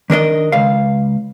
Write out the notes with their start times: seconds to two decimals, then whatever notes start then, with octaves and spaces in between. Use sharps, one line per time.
0.10 D#3 D4 A#4 D#5
0.52 C#2 F5